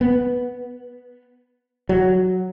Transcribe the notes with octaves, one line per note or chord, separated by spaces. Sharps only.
B3
F#3